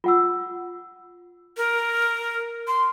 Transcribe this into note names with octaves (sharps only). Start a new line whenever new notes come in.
F4 F#5 E6
A#4
C6